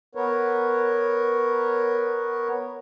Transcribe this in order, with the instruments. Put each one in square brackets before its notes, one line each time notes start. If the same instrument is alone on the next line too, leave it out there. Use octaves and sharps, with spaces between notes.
[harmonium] B3 A#4 B4 C#5